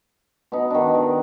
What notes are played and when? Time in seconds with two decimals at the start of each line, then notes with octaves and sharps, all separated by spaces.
0.52 B2 D#4
0.70 D#3 D4
0.95 A#4